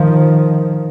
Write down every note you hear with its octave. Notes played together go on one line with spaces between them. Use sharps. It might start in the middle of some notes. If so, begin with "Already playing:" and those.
Already playing: D#3 F3